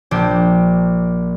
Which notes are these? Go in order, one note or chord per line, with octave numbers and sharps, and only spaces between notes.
A#1 G4